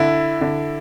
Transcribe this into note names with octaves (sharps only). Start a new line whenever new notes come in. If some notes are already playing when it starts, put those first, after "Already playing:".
Already playing: D3 E4
D3